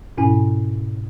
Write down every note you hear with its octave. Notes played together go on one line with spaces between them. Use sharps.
G#2 B2 C#4 E4 G#5